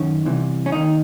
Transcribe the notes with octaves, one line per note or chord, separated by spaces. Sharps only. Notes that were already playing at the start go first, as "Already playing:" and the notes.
Already playing: F#2 D#3 C#4
C2 C3 E3
C#4
D#2 D#3 D#4